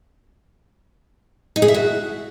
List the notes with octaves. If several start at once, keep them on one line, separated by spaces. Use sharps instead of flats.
D#4
G#4
E5
F#4